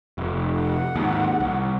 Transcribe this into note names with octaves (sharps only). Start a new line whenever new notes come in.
F1
F#5
D#2 G#2
C2